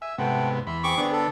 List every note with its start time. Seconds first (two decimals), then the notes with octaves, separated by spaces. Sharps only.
0.02 E5 G#5
0.18 G#2 C3 A3 B3 F#5 G5
0.67 E2 E5 B5 C6
0.84 C4 G#4 C#6 D6
0.98 D3 B3 D4
1.12 A4